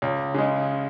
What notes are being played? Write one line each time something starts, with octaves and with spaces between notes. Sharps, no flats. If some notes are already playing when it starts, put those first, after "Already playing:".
C#2
C#3 G#3